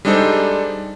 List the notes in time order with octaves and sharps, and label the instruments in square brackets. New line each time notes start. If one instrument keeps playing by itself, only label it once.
[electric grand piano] G3 G#3 D4 D#4 A4 C5